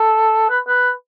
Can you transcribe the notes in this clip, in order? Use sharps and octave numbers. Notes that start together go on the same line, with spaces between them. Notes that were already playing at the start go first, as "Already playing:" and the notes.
Already playing: A4
B4
B4